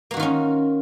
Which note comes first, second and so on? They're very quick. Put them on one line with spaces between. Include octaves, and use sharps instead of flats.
A#3 F#4 D#3 F4 C#4